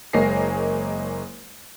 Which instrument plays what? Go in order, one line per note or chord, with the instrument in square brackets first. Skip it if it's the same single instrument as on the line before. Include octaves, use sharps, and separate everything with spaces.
[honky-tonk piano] F#1 G#3 A#3 C#5 A#6 C7